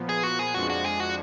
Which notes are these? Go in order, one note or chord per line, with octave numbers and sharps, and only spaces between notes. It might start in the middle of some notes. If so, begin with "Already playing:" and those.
Already playing: A#2 F3 B3
G#4
F#4
G#4
F2 F3 G#3 D4 F#4
F#4
G#4
F#4